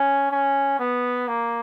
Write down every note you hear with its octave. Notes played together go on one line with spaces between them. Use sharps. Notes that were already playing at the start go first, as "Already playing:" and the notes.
Already playing: C#4
C#4
B3
A#3